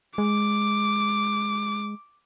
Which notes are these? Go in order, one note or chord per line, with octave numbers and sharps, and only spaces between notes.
G#3 D6